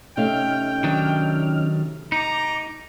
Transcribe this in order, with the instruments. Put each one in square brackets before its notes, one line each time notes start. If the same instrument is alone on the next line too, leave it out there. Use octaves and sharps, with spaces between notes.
[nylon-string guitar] C3 A3 F5 [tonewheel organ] C#4 D#4 F6 [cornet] G5
[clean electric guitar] D#3 F#3 D4
[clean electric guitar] D#4 [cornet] A#5 [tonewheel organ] D6